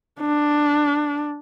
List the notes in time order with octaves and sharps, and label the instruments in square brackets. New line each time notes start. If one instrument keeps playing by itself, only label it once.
[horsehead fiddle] D4